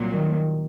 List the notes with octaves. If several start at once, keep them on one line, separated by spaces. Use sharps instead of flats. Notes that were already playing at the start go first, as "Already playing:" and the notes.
Already playing: C2 A#2 F#3
D#3